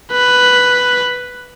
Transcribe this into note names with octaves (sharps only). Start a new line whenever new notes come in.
B4